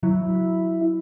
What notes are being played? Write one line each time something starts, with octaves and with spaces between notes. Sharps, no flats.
F#3 E4